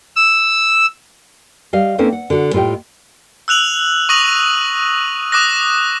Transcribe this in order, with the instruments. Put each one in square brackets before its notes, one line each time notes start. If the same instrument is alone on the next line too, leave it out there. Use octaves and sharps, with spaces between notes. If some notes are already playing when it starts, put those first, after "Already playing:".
[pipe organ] E6
[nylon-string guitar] G3 D#5 F5
A#3 C4 C#4 D#4 A4 B4
F#5
D3 F#4
A2 F4 G4 D#5 G5
[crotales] E6 F#6 F7 F#7
C#6 D#6 A#6 D#7 F#7
D6 D#6 F#6 A#6